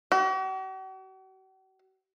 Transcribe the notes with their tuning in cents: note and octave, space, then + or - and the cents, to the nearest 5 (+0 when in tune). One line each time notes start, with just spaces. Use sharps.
F#4 +45